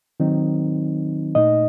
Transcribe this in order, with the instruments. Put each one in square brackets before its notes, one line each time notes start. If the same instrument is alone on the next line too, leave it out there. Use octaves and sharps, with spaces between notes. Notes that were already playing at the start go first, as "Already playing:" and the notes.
[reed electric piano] D#3 F#3 C4 D#4
A#2 A3 D#4 D#5